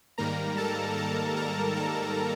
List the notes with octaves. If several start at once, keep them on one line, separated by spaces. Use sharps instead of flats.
G#2 D#3 G3 A#3 A#4 A#5
A4 A5
A4 A5
A#4 A#5
A4 A5